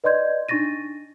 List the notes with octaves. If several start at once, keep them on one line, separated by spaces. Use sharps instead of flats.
B4 D5 D#5 C6 G6 G#6
D4 D#4 C#6 A6 A#6 D#7